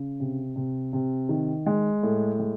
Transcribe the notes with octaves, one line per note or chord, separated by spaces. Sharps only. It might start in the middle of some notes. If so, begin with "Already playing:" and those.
Already playing: C#3
C3
C3
C3
D#3
G#3
A2
G#3